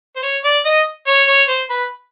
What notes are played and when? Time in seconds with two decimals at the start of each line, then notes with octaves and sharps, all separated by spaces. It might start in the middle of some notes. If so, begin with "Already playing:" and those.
0.16 C5
0.23 C#5
0.44 D5
0.65 D#5
1.07 C#5
1.27 C#5
1.48 C5
1.70 B4